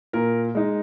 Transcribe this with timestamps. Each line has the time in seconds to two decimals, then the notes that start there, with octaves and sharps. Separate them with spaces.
0.13 A#2 A#4
0.55 G#3 D#4